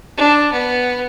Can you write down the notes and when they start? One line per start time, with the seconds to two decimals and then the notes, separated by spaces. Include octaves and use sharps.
0.17 D4
0.52 B3